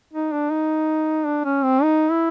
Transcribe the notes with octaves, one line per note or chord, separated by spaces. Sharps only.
D#4
D4
D#4
D4
C#4
C4
D#4
E4